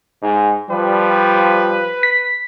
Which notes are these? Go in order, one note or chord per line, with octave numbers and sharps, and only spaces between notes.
G#2
F3 G3 B4
B6